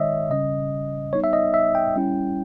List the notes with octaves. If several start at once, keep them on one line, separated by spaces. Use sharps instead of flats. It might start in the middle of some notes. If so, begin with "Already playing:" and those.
Already playing: D#3 G#3 D#4 C#5 D#5 E5
C#3 G3 C#4 D#5
G3 B3 D#4 C#5
E5
D#5
E5
G5
G3 C#4 E4